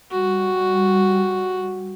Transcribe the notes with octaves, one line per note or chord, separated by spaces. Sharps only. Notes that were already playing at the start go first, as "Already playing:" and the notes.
G3 F#4